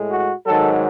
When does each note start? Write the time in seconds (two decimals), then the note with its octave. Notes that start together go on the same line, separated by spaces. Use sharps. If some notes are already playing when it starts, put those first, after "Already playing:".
Already playing: A2 G#3
0.10 F#4
0.46 G#2 D#3 F#3 A4